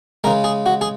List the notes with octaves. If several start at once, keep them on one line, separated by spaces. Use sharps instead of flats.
C#3 G#3 A#4
G#4
F#4
G#4